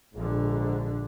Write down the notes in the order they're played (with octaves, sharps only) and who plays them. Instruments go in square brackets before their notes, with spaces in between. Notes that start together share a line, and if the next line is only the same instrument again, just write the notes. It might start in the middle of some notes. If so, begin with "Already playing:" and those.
[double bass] A#1 D3 [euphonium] G#2